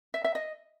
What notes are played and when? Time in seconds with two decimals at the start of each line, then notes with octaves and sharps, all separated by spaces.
0.14 E5
0.24 E5
0.35 D#5